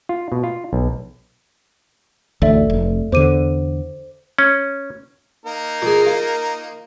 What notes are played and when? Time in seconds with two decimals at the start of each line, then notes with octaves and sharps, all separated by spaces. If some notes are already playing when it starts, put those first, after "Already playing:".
0.09 F4
0.32 B2
0.44 F4
0.73 B1
2.42 A1 D2 A4 D5 E5
2.70 F1
3.12 E2 D3 C5 D6 D#7
4.39 C#4
5.45 A#3 D#4 A#4
5.82 A#2 G#4
6.06 F4